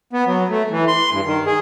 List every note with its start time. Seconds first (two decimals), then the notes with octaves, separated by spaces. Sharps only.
0.13 B3
0.26 F#3
0.49 A3
0.70 E3
0.88 C6
1.11 G2
1.25 D#3
1.46 G#4